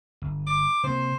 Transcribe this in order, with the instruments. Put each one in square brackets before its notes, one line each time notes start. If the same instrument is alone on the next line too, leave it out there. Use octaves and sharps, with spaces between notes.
[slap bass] G1
[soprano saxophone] D6
[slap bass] C3 A#3 [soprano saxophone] C5